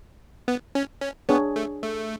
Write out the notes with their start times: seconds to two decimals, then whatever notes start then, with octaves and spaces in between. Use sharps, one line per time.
0.48 B3
0.75 C#4
1.01 C#4
1.29 B3 D4 G#4 C#5
1.56 A3
1.83 A3